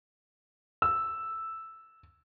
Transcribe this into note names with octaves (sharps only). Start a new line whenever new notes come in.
E6